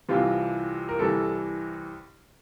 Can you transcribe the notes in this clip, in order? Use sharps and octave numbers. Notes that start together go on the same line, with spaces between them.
C2 C3 E3 F4
A#4
C2 C3 E3 A4